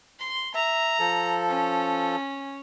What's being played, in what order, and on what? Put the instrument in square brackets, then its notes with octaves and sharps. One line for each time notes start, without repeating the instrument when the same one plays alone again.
[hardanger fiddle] C6
[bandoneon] E5 [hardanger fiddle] A#5
[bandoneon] F3 A4
[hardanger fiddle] C#4